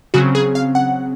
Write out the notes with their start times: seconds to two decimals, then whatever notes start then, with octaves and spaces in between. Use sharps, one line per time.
0.14 C#3 F#3 C4 F#4
0.35 G#4
0.55 F5
0.75 F#5